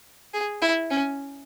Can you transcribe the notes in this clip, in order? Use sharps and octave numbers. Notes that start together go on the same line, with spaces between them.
G#4
E4
C#4